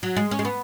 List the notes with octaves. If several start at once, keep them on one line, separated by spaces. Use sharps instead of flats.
F#3
G#3
C#4
G#3
B3